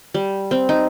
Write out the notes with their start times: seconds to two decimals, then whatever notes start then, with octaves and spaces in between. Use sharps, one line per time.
0.14 G3
0.51 C4
0.69 D#4